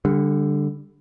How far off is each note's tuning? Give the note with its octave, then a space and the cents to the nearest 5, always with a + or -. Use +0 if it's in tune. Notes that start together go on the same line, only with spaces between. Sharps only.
D3 +0 G3 +25